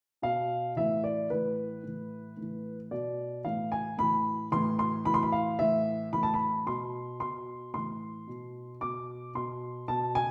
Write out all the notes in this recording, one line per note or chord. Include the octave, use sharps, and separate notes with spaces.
B2 F5
A2 E3 E5
D5
A2 E3 B4
A2 E3
A2 E3
B2 D5
A2 E3 F5
G#5
A2 E3 B5
A2 E3 C6
C6
A2 E3 B5
C6
B5
F5
A2 E3 E5
A2 E3 B5
A5
B5
B2 C6
B2 C6
A2 E3 C6
B2
B2 D6
B2 C6
B2 A5
G#5